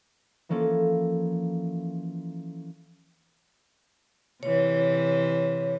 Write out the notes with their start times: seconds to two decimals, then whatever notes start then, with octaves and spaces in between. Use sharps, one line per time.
0.49 E3 F3 A#3 C#4 A4
4.43 C3 E3 C#5